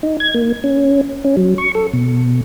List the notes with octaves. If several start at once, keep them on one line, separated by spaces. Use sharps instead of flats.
D#4
G#6
A#3
C#4
C#4
F#3
C#6
A4
B2